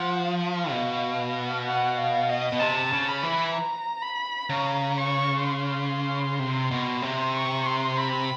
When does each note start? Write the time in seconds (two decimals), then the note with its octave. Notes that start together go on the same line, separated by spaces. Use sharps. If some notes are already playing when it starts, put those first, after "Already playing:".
Already playing: F3 F#5
0.23 F5
0.71 B2
1.66 F#5
1.98 F5
2.29 D#5
2.52 B2
2.60 C3 A5
2.92 C#3
3.08 B5
3.23 E3
3.54 A#5
4.02 B5
4.49 C#3 A#5
4.98 C#6
5.44 C6
6.39 C3
6.71 B2
7.02 C3
7.34 C#6
7.66 C6
7.97 B5